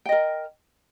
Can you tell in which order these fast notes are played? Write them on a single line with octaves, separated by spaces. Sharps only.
G5 D#5 A#4